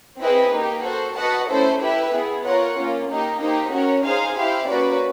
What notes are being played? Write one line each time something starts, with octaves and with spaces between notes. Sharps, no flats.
C4 E4 G#4 B4 D#5
A#3 D#4 G4
F#4 A4 C5
F#4 B4 D#5 F#5 A5
A3 C#4 E4 A4 C5
E4 G4 B4 E5
B3 E4 G#4
F4 A#4 C#5 F#5
A#3 C#4 F4
A#3 D#4 G4
A#3 D#4 G4 C5
C#4 F#4 A#4 C#5
D#4 G#4 C5 F5 G#5
E4 G4 C5 F5
A#3 C#4 F#4 B4 D5